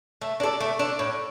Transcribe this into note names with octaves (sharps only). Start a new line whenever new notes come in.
A3
D4
A4 D5
A3
D4 A4
A2